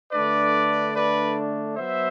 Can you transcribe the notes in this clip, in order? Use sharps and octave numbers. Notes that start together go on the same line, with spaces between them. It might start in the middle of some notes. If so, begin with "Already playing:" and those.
D3 A3 D4 B4 D5
B4 D5
F#3 B3 C5 E5